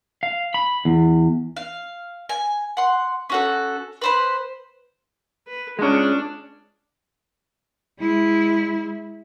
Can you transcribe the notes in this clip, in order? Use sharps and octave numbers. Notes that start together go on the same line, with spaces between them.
F5
B5
E2
F5
G#5
F#5 C6
C#4 F#4 A4
B4 C5 B5
B4
G#3 C#4 D4
G#3 E4